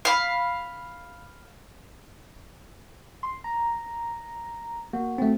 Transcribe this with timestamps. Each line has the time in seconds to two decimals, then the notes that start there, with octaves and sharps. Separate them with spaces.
0.05 F5 B5
3.23 C6
3.44 A#5
4.93 A#3 F#4
5.18 A3 C4